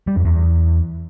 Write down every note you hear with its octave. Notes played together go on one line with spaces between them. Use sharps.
G3
F2
E2